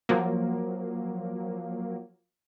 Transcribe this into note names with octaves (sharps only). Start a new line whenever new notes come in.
F3 F#3 A#3